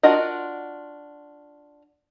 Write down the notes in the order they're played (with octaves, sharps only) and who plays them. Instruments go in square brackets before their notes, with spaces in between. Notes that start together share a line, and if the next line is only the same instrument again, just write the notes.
[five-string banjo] D4 F4 F#4 A#4 D#5